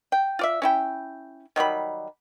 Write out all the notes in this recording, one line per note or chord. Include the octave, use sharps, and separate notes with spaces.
G5
F4 D5 E5
C#4 E4 G5
D#3 F#3 G3 B5